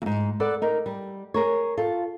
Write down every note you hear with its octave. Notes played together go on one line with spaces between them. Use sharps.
F2 G#2
A4 B4 D5 F#5
D#4 A#4
G3
G#4 A#4 C#5
F4 A4